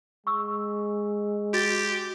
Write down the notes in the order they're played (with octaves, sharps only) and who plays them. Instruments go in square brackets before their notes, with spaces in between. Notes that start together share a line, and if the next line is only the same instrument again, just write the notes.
[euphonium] G#3 [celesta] C#6 E6
[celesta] F#4 A6 [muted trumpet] G4